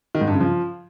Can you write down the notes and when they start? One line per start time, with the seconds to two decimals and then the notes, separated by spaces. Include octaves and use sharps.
0.15 D#3
0.21 G#2
0.27 G2
0.34 C#3
0.40 F3